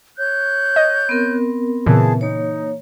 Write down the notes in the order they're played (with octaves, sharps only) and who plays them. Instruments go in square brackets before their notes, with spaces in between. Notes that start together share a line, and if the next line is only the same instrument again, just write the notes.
[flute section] C#5 F#6 G6
[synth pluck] D#5
[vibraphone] B3 C4 A#4
[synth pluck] A#2 C#3 E3 [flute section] G#4 A5
[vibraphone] A#3 C#5 [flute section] D#4